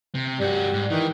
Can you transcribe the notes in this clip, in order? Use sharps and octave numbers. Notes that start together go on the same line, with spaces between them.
C3
G2 G3 F#4
G#2
D#3 E3